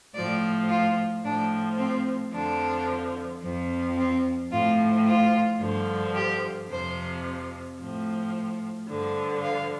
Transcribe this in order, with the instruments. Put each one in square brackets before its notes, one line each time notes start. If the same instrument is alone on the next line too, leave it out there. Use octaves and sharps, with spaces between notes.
[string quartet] A2 F3 D5
F4
A2 F3 D4
C4
F2 D3 F3 D4
F2 F3
C4
A2 F3 F4
F4
G2 D3 F3
G4
F2 C3 F3 C5
A2 F3
G2 D3 F3
F5